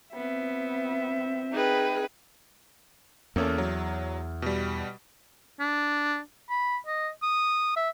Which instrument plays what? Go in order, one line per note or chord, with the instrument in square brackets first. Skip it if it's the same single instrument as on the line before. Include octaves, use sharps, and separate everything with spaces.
[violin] B3 [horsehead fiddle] C4 E5
[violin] D#4 G5 [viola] G#4 B4
[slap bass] E2 [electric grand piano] A#3 C#4 A4
[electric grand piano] F#3
B2 G3
[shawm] D4
B5
D#5
D#6
E5